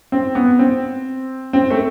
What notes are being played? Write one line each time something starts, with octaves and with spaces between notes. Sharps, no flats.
C4
B3
C4
C4
A3